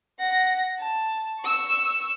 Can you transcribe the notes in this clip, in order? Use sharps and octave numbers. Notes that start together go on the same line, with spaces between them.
F#5 A#6
A5
C#6 E6